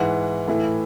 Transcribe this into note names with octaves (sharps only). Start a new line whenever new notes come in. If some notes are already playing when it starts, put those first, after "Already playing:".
Already playing: G#2 E3 F#5
A2 E3